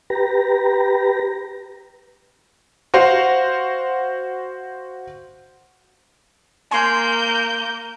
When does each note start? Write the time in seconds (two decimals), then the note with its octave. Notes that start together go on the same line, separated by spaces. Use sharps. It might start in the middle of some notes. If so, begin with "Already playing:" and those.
0.10 G4 B4 A#5
2.94 F#4 C5 F5
6.71 A#3 G#5 C6 G6